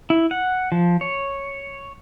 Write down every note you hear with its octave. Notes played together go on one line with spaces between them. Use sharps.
E4
F#5
F3
C#5